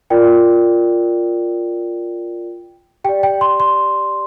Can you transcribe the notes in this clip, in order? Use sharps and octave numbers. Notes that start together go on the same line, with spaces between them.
F4 A#4 D5 G5
G4 D5 G5
G5
C6
C6